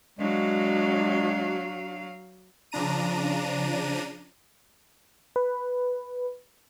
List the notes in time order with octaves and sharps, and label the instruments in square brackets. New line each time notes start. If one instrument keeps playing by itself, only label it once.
[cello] F#3 F5 [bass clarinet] G#3 [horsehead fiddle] D4 F#4
[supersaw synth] C#3 F3 D4 A#5 D#7
[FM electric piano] B4